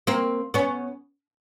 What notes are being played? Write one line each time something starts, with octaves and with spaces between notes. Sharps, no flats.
A#3 C4
B3 C#4